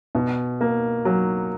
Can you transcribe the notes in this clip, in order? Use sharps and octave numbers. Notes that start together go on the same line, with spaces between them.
B2
A#3
F#3